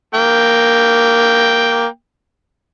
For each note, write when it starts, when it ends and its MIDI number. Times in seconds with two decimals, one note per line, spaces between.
0.14 1.86 58
0.14 1.86 79